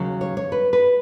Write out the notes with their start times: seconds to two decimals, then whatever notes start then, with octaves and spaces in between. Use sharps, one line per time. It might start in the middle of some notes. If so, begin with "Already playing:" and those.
Already playing: D#2 C#3 F#3
0.21 C#5
0.37 C#5
0.52 B4
0.73 B4